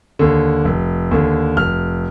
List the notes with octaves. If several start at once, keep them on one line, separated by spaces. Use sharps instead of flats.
D#2 D3
F1
D#2 D3
F1 F6